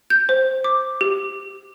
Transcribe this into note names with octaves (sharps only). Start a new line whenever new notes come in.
G6
C5
D6
G4